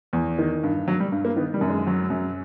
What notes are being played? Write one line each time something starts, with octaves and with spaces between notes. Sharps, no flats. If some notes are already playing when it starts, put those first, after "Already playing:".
E2
D#3
G2
F#3
G3
G2
A#3
D#3 B3
G3
F#2
G#3
F#3
F#2